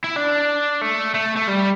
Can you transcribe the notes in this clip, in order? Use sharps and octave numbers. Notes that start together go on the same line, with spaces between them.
E4
D4
A3
A3
A3
G3